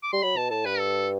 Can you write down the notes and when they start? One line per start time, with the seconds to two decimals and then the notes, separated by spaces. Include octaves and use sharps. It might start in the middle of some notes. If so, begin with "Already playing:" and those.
0.03 D6
0.13 G3 C6
0.23 F#3 B5
0.36 B2 A5
0.50 A2 A5
0.65 G2 B4
0.79 A4